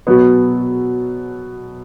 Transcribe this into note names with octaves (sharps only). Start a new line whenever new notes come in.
B2 F#3 B3